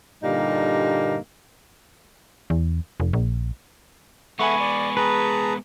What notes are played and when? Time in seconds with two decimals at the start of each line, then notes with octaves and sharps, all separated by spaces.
0.23 G2 A#2 D3 G3 A#3 D#4
2.50 E2
3.00 F1
3.13 A#1
4.39 G#3 B3 A4 E5 F#5 G#5 B5 C#6
4.60 D5
4.97 G#4 B4 A5 A#5